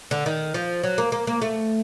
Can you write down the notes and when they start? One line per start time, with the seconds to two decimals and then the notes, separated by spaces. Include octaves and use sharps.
0.11 D3
0.26 D#3
0.54 F3
0.83 F#3
0.98 A#3
1.12 A#3
1.27 A#3
1.42 A3